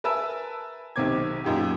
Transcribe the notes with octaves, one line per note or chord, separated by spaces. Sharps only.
A#4 B4 E5 G#5 A5 E6
B1 C3 D#3 C4 D6 G#6
F#2 A#2 D#4 G4